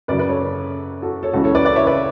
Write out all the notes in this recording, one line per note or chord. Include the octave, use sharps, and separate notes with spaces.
F#2 C#3 F#3 B4 D5
B4 D5
A4 C#5
F#4 A4
A4 C#5
C#2 C#3 E3 F#4 A4
A4 C#5
B4 D5
B4 D5
C#5 E5
B4 D5